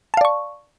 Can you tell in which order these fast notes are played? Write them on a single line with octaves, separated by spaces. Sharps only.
A5 F5 D5 C#6